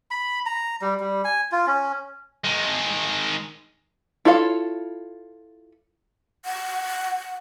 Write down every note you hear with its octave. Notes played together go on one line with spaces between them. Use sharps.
B5
A#5
G3
G3
G#5
F4
C#4
D#3 G#3
E4 F4 A4 C#5 F5
F#5